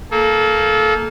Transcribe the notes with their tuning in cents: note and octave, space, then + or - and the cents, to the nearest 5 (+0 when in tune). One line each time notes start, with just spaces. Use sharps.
A#3 -10 A4 -30